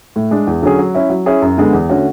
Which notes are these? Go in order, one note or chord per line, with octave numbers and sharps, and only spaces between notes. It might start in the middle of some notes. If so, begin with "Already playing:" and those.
A2
G#3 D4
E2
D3 F#3 C#4 G#4
F#3
C#4 E4
F#3
C#4 E4 G#4
F#2
D3 G#3 B3
E2
D3 A3 C#4 F#4